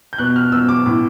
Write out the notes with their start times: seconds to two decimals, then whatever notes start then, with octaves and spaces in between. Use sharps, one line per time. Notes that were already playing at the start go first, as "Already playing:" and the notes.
0.13 G6
0.19 B2 F#6
0.36 F6
0.52 B2 E6
0.69 D6
0.86 A2